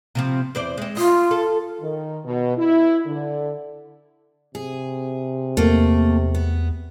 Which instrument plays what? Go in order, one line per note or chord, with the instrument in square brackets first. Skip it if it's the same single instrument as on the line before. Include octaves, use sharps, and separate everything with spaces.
[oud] C3 F3 C4
E2 C5 D5
G#3 C4
[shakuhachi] F4 [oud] D#5
[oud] A4
[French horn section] D#3
B2
E4
D3
[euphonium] C3 [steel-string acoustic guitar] G#4
[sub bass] E2 [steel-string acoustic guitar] A3 A#3
[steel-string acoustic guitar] B3